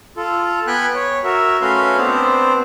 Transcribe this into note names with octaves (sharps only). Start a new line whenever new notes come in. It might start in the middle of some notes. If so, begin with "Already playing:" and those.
F4 A4
B3 G5 G#5 B5 F#6
C#5
F#4 A#4 E5
A3 C#4 F#4 B4 F5 C6
B3 C4 D4 C5